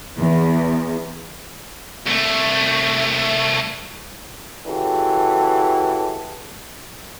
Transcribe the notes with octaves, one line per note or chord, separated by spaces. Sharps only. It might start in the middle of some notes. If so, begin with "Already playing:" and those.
E2
C2 A3
C#3 E3 F#4 G4 A4